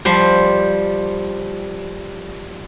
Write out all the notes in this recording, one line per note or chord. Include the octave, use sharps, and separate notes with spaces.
F3 G3 C5